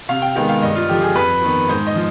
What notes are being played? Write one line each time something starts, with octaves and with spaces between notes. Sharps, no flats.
C3 F5
G5
D#3 G#3 B3 G5
F5
G2 D#5
F4
D3 F3 G4
G#4
F2 B4
D#3 B3
G#2 C5
D#5
F3